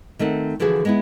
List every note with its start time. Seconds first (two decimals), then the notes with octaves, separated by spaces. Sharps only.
0.19 D#3 A3 C4 F#5
0.60 D3 E3 F3 F#4 G#4
0.85 G#3 B3 E4